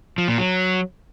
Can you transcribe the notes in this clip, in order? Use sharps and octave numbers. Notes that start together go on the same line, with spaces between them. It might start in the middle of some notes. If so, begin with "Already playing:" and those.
F3
A#2
F#3